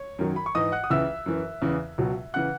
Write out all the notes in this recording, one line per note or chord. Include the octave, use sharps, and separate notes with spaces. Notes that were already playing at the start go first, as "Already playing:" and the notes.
Already playing: C#5
F#2 D#3 F#3
B5
C#6
G#2 E3 D#5 D#6
F#5 F#6
D#6
C#2 C#3 E3 E5 E6
F#2 E3
E2 C#3 E3
C#2 B2 F#3
C#3 E3 F#5 F#6